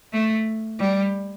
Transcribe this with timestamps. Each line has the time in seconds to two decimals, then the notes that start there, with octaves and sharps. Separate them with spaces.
0.13 A3
0.79 G3